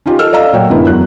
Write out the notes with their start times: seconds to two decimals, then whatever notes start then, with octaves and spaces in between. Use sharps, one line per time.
0.06 C#4 D#4 F4 G4
0.19 A4 D#5 E6 F6
0.32 D5 D#5 F5 A#5 E6
0.53 A#2 F#3 C#5 F#5 G5
0.70 F#2 D3 G#3 B3 E4
0.87 E2 F#3 F#6